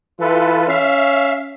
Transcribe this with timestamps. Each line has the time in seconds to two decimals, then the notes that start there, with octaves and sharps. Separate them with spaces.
0.20 E3 F4 A4 B4
0.68 C#4 E5 F5